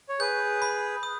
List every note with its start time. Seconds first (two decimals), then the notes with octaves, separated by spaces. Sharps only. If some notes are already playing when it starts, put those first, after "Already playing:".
0.09 C#5
0.20 G#4 B4 G6
0.62 B5
1.03 D#6